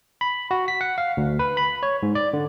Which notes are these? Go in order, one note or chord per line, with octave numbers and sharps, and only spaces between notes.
B5
F#4
B6
F#5
F5
D2
B4
B5
C#5
G#2
D5
D3